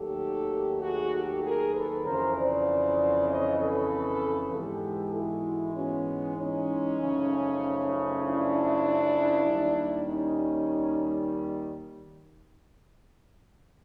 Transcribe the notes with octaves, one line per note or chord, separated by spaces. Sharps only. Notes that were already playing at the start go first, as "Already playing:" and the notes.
Already playing: D#2 D#3 F#3 A3 G4 A4
F#4 G#4
G4 A4
G#4 A#4
A4 B4
F2 C#3 E3 A#4 C5
C5 D5
C#5 D#5
A4 B4
G#2 E3 G#3 B3 G4 A4
E4 F#4
B3 C#4
C#4 D#4
F#2 C#3 F3 A3
D4 E4
D#2 D#3 G3
C#4 D#4